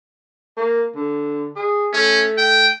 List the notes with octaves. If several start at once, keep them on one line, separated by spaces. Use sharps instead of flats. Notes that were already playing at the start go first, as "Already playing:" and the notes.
A#3
D3
G#4
A3 C#4
G5